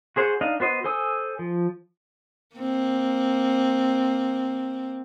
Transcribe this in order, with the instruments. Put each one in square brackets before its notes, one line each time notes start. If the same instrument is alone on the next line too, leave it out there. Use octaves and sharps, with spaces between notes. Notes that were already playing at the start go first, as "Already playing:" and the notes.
[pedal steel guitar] F#4 G#4 C5 F#5
D4 D#4 D#5 F5
B3 F#4 C5 D#5
A4 C5 G#5 D#6 E6
F3
[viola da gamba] A#3 C4